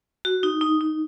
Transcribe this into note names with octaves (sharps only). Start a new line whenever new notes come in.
F#4
D#4
D#4
D#4